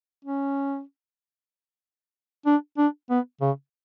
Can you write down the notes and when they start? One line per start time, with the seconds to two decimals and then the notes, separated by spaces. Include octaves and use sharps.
0.25 C#4
2.46 D4
2.78 D4
3.10 B3
3.41 C#3